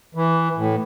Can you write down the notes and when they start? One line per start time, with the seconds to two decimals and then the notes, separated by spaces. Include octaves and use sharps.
0.15 E3
0.57 A2